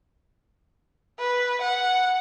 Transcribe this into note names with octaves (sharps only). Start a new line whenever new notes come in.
B4
F#5